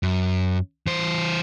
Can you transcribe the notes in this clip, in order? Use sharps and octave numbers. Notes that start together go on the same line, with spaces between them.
F#2
E3 C5